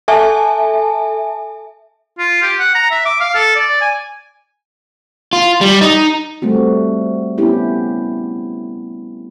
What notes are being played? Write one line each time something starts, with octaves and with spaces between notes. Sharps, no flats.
A4 E5 G#5 A5
F4
G4
F#5
A#5
E5
D6
F5
A4
D5
G#5
F4
G3
D#4
G3 A3 C4 F#4
B3 C#4 E4 G4